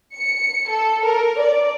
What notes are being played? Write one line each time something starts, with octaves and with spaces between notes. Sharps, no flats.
C#7
A4
A#4
D5